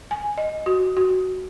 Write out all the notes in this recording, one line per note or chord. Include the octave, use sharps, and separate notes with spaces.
G#5
D#5
F#4
F#4